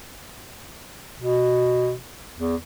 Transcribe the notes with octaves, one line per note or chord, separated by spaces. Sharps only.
B2
E2